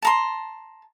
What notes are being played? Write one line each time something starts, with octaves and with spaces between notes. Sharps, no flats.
A5 A#5 C6